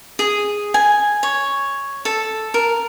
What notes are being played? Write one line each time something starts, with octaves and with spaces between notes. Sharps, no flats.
G#4
G#5
C#5
A4
A#4